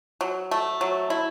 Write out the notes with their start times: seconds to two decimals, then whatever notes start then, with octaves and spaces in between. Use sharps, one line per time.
0.21 F#3
0.51 A3
0.81 F#3
1.10 E4